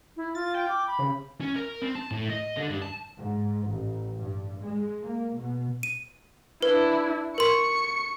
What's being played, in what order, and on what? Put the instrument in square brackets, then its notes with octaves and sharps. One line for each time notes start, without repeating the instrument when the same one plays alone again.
[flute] E4
[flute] F4 [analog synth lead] A6
[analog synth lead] G5
[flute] D6
B5
[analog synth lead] C#3
[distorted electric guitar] C#4
A#4
C4
A5
A2
D#5
D3
G2
A5
[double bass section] G#2
A1
G2
G#3
A#3
B2
[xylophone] D#7
[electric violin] D4 E4 [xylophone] B4
[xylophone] A#4 C6 [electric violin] C#6 C#7